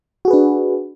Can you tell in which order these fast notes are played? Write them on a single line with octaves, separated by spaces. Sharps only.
F#4 G#4 B4 D4